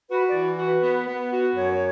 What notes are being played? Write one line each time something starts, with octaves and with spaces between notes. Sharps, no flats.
F#4 B4
D5
E3
F#4
B4
B3
B3
F#4
F#2 C#5